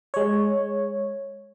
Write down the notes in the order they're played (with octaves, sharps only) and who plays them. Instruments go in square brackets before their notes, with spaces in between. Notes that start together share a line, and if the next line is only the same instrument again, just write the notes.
[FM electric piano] G#3 C#5